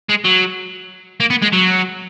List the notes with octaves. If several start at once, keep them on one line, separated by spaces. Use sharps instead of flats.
G#3
F#3
A#3
B3
G#3
F#3